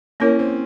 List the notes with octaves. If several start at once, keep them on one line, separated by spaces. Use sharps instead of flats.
A#3 C#4 E4 A#4 C#5
C4